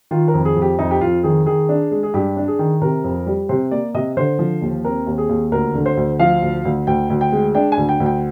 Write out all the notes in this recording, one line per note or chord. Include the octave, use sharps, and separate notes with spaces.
D#3 F4
A#4
F2
G#4
F2
G4
F2 D#4
G4
F2 F4
D#3 G#4
D#3 G#4
D4
G#3
G#4
G2 G4
D4
G#4
D#3
C3 A#4
F2
G3
C3 C5
A#3 D5
C3 D#5
D3 C5
F3
D#2
C4 A#4
D#2
G#4
D#2
D2 A#4
D3
C5
D2
F3 F5
D2
D2
D2 G5
D2
G5
G#3
D4 G5
G#5
D2
G5
D2
G5